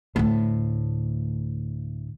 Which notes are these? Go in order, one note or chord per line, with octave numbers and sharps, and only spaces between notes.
D2 A2